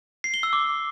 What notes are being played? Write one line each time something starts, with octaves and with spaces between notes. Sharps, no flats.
C7
G7
E6
D6